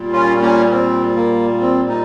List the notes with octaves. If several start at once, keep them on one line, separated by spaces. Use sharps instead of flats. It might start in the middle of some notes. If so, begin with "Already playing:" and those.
Already playing: A#2 G3
C#4 F4
A#3 C#4
C4
A#3
C4
D#4